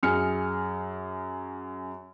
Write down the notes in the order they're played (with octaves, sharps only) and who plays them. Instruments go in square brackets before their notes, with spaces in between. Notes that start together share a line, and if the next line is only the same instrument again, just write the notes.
[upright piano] F#2 G#4 F6 C#7